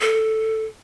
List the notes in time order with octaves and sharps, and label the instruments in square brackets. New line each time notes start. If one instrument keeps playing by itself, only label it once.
[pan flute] A4